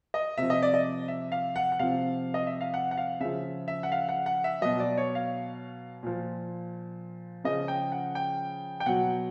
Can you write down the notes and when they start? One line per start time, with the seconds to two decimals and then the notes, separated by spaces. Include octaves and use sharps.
0.14 D#5
0.38 C3 F3 E5
0.50 D#5
0.62 D5
0.74 D#5
1.08 E5
1.32 F5
1.56 F#5
1.72 F#5
1.79 C3 F3 F5
2.34 D#5
2.47 E5
2.61 F5
2.74 F#5
2.91 F#5
2.97 F5
3.20 C#3 F3 E5
3.68 E5
3.83 F#5
3.92 F5
4.09 F#5
4.26 F#5
4.44 E5
4.61 B2 F#3 D#5
4.80 D5
4.98 C#5
5.15 F5
6.03 A#2 F3
7.44 C#3 F3 D#5
7.68 G5
7.92 F#5
8.15 G5
8.80 G5
8.86 B2 F#3 F#5